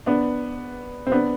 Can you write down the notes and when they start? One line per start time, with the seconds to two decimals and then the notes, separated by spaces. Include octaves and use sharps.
0.06 B3 D4
1.07 C4
1.12 B3 D4